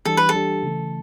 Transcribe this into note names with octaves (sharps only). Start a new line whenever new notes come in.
E3 G3 D4 G4 A4
B4
A4
E3 G3 D4 G4
C#3 E3 A3